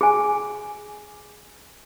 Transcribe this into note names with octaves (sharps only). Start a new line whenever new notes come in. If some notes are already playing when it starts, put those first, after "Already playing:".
G#4 G#5